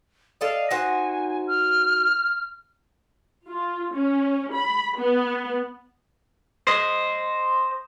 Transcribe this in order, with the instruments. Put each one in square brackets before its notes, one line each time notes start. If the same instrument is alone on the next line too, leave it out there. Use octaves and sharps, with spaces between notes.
[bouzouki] A4 D5 D#5 [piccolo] F5
[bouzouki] D#4 F#4 C5 [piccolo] G#5
[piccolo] F6
[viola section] F4
C#4
B5
B3
[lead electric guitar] C5 D#5